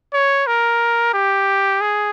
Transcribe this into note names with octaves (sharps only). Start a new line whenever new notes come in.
C#5
A#4
G4
G#4